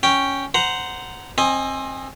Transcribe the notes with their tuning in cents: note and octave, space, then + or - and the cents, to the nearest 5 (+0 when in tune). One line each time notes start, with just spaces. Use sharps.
C#4 +0 G5 +0
C5 -15 F#5 +0 A#5 +0
C4 +25 D#5 +0 G#5 +0